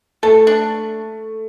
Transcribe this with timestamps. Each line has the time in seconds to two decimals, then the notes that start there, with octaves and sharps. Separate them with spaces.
0.23 A3 A4
0.47 D4